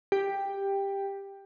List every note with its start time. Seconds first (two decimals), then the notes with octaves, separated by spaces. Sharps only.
0.12 G4